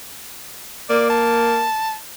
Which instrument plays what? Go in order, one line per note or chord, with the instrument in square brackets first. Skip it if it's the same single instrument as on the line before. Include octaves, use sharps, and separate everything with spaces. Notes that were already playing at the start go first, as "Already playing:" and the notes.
[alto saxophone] A#3 [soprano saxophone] D5
[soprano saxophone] A5